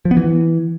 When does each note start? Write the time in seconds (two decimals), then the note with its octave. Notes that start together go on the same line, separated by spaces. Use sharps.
0.05 F3
0.11 B3
0.17 E3